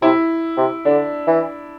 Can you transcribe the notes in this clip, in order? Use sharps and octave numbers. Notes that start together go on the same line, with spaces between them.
C3 E4
C3
D3 D4
E3